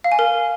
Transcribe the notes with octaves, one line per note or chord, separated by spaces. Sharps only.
F5
G#5
A#4